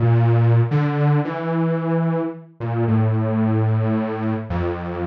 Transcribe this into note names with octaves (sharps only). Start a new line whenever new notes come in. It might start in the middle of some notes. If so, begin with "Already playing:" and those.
Already playing: A#2
D3
E3
A#2
A2
F2